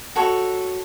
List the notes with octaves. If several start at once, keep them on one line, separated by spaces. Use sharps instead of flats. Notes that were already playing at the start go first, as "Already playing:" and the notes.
F#4 A4 C#5